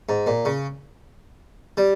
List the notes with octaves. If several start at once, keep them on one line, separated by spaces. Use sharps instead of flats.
G#2
A#2
C#3
G3